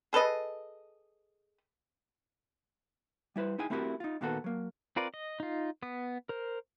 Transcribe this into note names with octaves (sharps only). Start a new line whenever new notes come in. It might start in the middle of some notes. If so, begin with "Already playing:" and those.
G#4 A4 B4 D#5
G3 E4 B4 C5
D#4 E4 G#4 G5 G#5
A3 C4 E4 F#4 G4 A#4
D#4 F4
A#2 D#3 A#3 B3 F#4 A4
F#3 A#3
C4 F4 A#4 B4 D5
D#5
D#4 F4
B3 D#6
A#4 C5